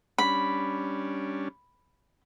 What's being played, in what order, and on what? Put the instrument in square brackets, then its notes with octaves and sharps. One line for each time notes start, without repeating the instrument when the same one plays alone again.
[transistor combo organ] G3 C#4 D4 [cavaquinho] B5